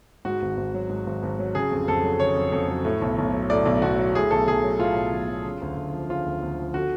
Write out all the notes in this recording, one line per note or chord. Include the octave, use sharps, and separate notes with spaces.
G#2 F#4
G#1
G#1
F#3
G#2
G#1
G#1
F#3
C#3 G#4
F2
F2 A4
F#3
C#3 C#5
F2
F2
F#3
A2
B1
B1
F#3
A2 D5
B1
B1 F#4
F#3
A2 G#4
B1 A4
B1 G#4
F#3
A2 F4
B1
B1
F#3
C#3
D2
D2
F3
C#3 F4
D2
D2
F3
D3 F#4